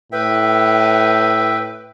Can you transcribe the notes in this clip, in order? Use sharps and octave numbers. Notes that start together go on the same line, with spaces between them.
A2 B4 E5 G5